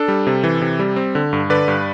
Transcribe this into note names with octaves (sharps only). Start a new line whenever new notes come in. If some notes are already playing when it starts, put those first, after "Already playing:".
Already playing: D4 A4
G3
C3
E3
C3
G3
C4
D3
G2
D3 B4 D5
G2